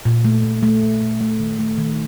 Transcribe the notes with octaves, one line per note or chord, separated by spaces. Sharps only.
A#2
A3
A#2
A3
A#2
A#2
A3
D#3
A3
D#3